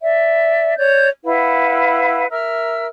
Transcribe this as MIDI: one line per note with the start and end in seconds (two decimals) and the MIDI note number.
0.02 0.73 74
0.02 0.73 76
0.77 1.08 73
0.77 1.08 74
0.77 1.08 91
1.24 2.26 64
1.24 2.26 71
1.24 2.26 77
1.24 2.26 78
2.31 2.87 70
2.31 2.87 76
2.31 2.87 88
2.31 2.87 89